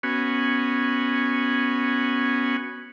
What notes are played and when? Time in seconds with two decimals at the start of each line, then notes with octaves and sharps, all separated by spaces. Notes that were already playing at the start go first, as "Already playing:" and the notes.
0.03 B3 C#4 F#4 G#5